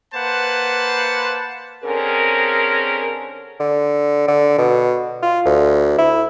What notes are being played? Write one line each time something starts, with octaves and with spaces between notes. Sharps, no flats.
A#3 B4 C5 F#5 A5
D3 C4 C#4 G#4 A#4
D3
D3
B2
F4
D2
E4